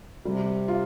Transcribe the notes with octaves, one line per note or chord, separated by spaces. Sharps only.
C3 G3
F4